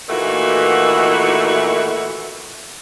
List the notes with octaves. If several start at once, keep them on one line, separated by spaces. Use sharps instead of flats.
A#2 D#3 E3 A3 F#4